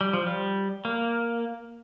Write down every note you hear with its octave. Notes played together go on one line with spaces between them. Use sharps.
G3
F3
G3
A#3